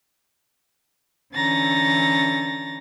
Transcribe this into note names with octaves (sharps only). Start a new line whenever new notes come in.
D3 E3 C#4 A#5 A6 A#6